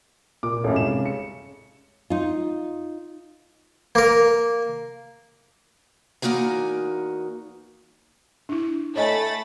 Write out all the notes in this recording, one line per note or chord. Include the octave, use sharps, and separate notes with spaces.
A#2 D6
A1 F#2 C#3 A4
C2 G#2 E7
C#7
D#4 F4
A#3 A#4
E2 A#3 D#4 F#4 G#5
D4 E4
A3 C#5 D#5 G#5 B5 A6